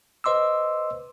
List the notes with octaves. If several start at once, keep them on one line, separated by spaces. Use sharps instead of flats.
B4 C5 D#5 C6 D6 E6